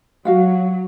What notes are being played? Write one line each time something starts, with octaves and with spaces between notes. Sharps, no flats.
F#3 F#4 F5 F#5